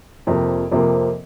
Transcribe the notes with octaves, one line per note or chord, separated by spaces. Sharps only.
F2 C3 F3 A#3
F2 C3 F3 A#3